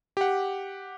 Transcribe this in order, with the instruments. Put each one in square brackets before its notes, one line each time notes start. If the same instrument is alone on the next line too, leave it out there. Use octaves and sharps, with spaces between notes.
[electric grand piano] G4 F#5